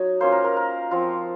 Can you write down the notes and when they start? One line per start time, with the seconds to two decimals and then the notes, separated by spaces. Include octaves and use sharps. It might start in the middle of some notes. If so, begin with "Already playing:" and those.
Already playing: F#3 D#4 C#5
0.20 A#3 C#4 F4 C5
0.32 A#4
0.44 A#4
0.57 A#4
0.91 F3 C4 F4